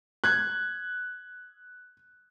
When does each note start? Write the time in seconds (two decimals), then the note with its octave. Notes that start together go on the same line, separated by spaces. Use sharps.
0.24 F#6 G#6